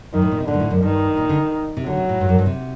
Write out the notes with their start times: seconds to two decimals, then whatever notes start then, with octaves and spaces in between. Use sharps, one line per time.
0.14 F#2 D#3
0.22 A2
0.31 A#2
0.40 C3
0.48 A#2 D3
0.54 G2
0.60 A2
0.71 F#2
0.83 G2 D#3
1.17 A#2
1.29 D3
1.77 C3
1.86 D3 F#3
1.97 C3
2.09 A2
2.20 G2
2.29 F#2
2.39 G2
2.46 C3